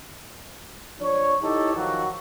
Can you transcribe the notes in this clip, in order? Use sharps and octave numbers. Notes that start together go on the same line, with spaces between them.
F3 D4 C#5
D#4 E4 G4 A4 C#5
D#3 F3 F#3 F#4